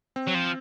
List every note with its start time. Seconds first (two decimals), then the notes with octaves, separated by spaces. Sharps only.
0.16 C4
0.27 F#3
0.34 F3